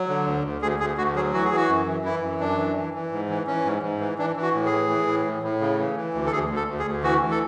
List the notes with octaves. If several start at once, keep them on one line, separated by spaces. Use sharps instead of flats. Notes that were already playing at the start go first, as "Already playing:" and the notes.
Already playing: F#3
D3
D2
D2
D2 G#4
D2 G#4
D2 F#4
F#3 G#4
E3 F#4
G#4
E3 F#4
F#2
E3
E3 E4
F#2
F#2 D4
E3
E3
E3
G#2
E3
E3 C#4
G#2
G#2
E3
E3 D4
E3
F#4
A2
G#4
E3
E3
A2
A2
A2
C#3
E3
E3
D2
A4
D2 G#4
D2
A4
D2
G#4
D2
E3 F#4
E3
A4